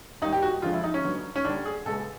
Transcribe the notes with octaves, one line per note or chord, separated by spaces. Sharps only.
D#2 D#3 G3 D#4
G4
F#4
F2 D3 F3 G#3 F4
E4
D#4
C#4
G2 D3 F#3
C#4
D2 D3 G3 D4
G#4
C#2 B2 G#3 A4